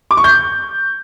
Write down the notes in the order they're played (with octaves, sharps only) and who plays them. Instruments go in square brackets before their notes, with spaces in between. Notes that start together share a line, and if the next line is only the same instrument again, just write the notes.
[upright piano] D6
C#6
G6